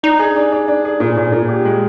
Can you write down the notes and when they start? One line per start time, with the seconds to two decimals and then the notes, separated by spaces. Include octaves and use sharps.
0.03 D4 D#4
0.19 G#4
0.36 D4
0.52 D4
0.68 D4
0.85 G#4
1.00 A#2
1.17 A#2
1.32 A#2
1.49 G4
1.65 G#3